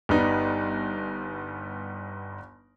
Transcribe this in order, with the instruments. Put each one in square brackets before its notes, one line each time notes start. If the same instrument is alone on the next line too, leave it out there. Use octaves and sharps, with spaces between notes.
[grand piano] G1 G3 B3 D#4